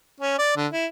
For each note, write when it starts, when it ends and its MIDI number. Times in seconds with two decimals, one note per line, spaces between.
0.20 0.36 61
0.39 0.54 74
0.57 0.67 50
0.72 0.86 64